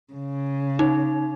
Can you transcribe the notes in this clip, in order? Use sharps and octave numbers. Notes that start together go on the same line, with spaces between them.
C#3
D#4